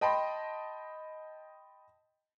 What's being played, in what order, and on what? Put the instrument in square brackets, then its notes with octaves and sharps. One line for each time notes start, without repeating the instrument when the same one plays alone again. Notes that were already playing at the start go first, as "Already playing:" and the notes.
[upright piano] D#5 G5 A5 B5 C6